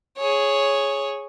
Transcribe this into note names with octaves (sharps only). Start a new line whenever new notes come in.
G#4 C#5